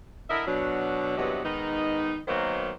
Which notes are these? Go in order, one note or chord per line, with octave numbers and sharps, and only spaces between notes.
D3 E4 A#4 D#5 E5
B2 F#3 D4
E2 G2 C3 F#3 B3 D#5
G#2 D#3 B3 D#4
D#3 F#3 A#3 B3 C5 D#5